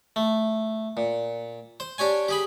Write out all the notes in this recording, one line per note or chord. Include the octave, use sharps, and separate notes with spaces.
A3
A#2
C5
D4 G4 C#5 G#5
G4 G#4 B5